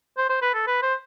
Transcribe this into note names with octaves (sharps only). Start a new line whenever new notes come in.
C5
C5
B4
A4
B4
C5